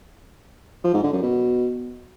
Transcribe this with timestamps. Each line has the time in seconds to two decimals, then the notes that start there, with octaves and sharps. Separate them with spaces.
0.84 F3
0.94 G#2
1.03 D3
1.13 F#2
1.22 B2